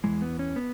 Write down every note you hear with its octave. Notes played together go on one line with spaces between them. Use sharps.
E2 C#3 E3 G#3
B3
C#4
B3